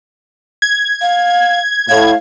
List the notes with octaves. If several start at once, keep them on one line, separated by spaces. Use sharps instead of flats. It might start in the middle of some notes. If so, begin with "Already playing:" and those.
G#6
F5
A2 F5 G#6